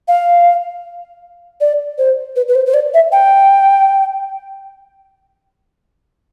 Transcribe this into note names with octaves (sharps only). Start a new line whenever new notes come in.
F5
D5
C5
B4
B4
C5
C5
D5
E5
G5